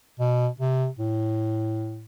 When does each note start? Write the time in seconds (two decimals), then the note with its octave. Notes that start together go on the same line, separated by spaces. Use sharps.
0.20 B2
0.60 C3
0.99 A2